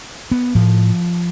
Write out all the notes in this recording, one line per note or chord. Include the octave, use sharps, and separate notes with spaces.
B3
A2 F3